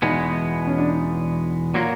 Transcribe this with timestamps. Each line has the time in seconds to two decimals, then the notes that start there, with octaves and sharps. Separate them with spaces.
0.02 E2 B2 G#3 B3 D#4
0.67 C#4
0.78 D4
0.89 D#4
1.74 A#2 F#3 A#3 F4